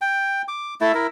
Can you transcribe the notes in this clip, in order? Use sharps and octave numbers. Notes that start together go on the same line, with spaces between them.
G5
D6
A3 E4 E5
E4 A#4